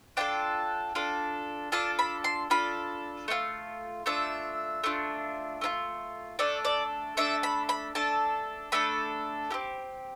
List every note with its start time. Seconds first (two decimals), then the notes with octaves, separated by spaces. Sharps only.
0.17 D4 F4 A4 G5
0.95 D4 F4 A4
1.72 D4 F4 A4 A5
1.99 B5
2.24 C6
2.50 D4 F4 A4 B5
3.28 A3 D4 F4
4.06 A3 D4 F4 E5
4.84 A3 D4 F4
5.61 A3 D4 F4
6.39 A3 D4 A4 D5
6.65 D5
7.17 A3 D4 A4 E5
7.43 B5
7.69 B5
7.95 A3 D4 A4 A5
8.72 A3 D4 A4 B5
9.50 C4 E4 G4